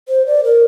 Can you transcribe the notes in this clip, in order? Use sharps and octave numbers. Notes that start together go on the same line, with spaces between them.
C5
D5
A#4